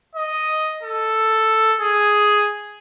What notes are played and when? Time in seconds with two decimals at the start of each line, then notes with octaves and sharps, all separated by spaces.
0.15 D#5
0.83 A4
1.81 G#4